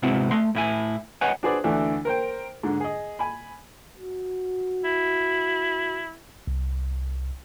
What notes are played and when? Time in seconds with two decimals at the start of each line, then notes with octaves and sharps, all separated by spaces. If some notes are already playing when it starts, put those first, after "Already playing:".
0.02 G#2 C3 B3 C4 E4 F#4
0.31 A3 C6
0.55 A2 E4 G#5
1.21 B4 C#5 D#5 F#5 G#5
1.43 D4 F#4 G#4 B4 C5 D5
1.64 D2 D3 E3 A3 D4 F#4
2.05 A#4 C5 G5
2.63 G#2 D3
2.80 G#4 D#5
3.19 G#5 B5
3.97 F#4
4.84 E4
6.47 C2